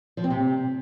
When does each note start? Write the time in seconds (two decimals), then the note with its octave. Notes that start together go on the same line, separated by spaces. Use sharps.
0.17 F3
0.24 C4
0.30 C3